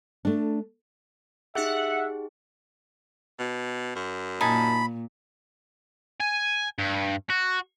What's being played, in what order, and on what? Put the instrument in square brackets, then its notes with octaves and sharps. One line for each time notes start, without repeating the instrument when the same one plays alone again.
[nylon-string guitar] A3 D4
[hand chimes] D#4 G4 G#4 [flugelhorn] E5 [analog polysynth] F#5
[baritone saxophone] B2
F#2
[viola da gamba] A#2 [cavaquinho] D#4 G#5 A5 [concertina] B5
[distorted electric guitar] G#5
G2
F#4